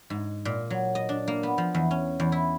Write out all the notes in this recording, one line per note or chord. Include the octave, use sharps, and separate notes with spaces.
G#2
A#2
F#3
D#5
D4
A#3
B3
F3
E2
C#4
E2
E4